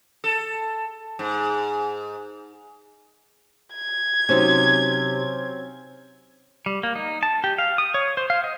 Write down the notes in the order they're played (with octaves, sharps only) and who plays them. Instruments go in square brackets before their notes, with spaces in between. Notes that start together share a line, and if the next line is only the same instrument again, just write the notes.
[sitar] A4
G#2
[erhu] G#6
[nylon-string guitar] C3 D#4 [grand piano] F#3 C4 C#4
[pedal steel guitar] G3
A#3
D#4
A5
G4
F5
D#6
C#5
C5
F5
D#5